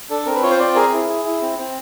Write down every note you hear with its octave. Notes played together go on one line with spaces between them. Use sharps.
D4 A4
C4 A#4
B4
F4 C#5
C5
C4 D5
G#4 A#4
E4
G#4
E4
C4
C4